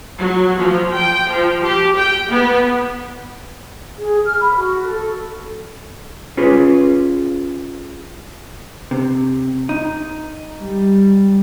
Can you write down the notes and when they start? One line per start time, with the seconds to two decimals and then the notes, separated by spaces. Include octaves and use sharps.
0.20 F#3
0.59 F3
0.94 G5
1.33 F3
1.64 G4
1.97 G5
2.31 B3
3.99 G#4
4.25 F6
4.40 B5
4.54 F#4
4.84 A4
6.37 C#4 F4 G#4 B4
8.91 C3
9.69 D#4
10.61 G3